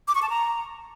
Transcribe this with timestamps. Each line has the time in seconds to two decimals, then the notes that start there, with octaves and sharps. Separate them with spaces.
0.08 D6
0.15 C#6
0.22 A5
0.29 A#5